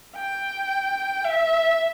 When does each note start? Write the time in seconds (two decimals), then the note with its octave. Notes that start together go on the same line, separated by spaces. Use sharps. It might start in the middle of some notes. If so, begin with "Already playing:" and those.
0.16 G5
1.24 E5